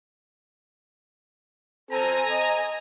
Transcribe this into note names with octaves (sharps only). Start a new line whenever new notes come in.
C4 A4 C5 G#5 A#5
D#5